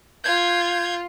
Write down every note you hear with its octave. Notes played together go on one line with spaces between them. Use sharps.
F4 G6 G#6